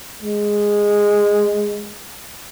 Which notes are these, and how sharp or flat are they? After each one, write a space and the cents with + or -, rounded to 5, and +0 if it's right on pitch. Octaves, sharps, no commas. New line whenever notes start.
G#3 -10